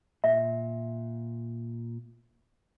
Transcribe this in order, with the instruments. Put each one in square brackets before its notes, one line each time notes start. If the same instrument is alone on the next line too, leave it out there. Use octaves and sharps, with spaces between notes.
[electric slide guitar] A#2 [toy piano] E5